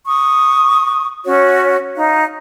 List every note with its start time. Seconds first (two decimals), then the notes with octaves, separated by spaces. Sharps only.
0.06 C#6 D#6
1.25 C#4 F#4 C#5
1.96 D#4 F5